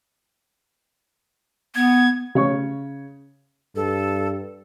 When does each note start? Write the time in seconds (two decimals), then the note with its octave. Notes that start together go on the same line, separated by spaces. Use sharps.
1.75 B3 G#6
2.35 C#3 C#5 C#6
3.76 G2 A4